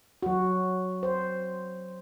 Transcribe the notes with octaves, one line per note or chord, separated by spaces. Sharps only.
F#3 F#4
C5